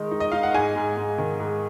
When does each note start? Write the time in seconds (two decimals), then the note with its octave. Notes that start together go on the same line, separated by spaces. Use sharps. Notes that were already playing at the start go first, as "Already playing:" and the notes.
Already playing: D#3 G#3 D#4
0.11 D#4
0.20 D#5
0.32 D#4 F5
0.43 F#5
0.54 G#2 G#5
0.76 G#2
0.97 G#2
1.18 D#3
1.40 G#2